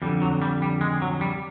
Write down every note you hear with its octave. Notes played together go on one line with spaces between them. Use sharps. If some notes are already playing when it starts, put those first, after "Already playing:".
F2 D3 G3
F#3
G3
G3
G#3
F#3
G3